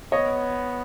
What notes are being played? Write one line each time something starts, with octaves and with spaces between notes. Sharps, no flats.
B3 C#5 D#5